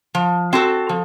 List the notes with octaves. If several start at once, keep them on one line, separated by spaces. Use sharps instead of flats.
F3
C4 F#4 A4
F3